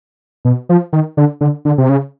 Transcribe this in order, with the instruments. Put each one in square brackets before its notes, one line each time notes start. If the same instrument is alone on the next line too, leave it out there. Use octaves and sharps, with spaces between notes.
[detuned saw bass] B2
F3
D#3
D3
D3
D3
C3
C#3